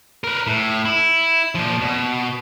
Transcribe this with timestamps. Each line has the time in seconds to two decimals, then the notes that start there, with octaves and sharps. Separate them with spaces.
0.24 A#4 B4
0.47 A2
0.86 E4
1.55 A#2 F3
1.81 B2